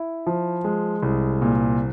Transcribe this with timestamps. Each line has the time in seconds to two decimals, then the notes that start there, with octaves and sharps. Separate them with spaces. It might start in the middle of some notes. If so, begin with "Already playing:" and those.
Already playing: E4
0.27 F3
0.64 G#3
1.03 C2
1.42 A#2